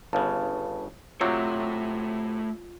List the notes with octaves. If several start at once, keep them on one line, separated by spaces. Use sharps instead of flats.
G1 C#3 B4 F5 A5
C3 F#3 A3 C4 F4 C#5